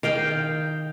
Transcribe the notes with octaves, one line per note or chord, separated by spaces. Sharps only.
D#3 F5 G5